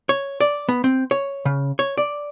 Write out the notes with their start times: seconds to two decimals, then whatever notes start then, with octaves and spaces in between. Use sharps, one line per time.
0.09 C#5
0.41 D5
0.69 B3
0.84 C4
1.11 C#5
1.45 C#3
1.79 C#5
1.98 D5